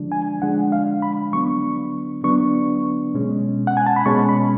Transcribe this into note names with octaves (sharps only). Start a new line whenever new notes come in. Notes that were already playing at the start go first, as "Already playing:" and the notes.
Already playing: D3 F3 G#3 D4
G#5
D3 F3 G#3 D4 F#5
F5
B5
D3 F#3 B3 D4 C#6
D3 F#3 B3 D4 C#6
B2 G#3 C#4
F#5
G#5
A5
B5
B2 G#3 C#4 C#6
B5